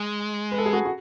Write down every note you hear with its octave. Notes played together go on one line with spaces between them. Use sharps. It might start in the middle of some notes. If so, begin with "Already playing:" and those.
Already playing: G#3
B4
A4
G#4
F#4 A4
F#4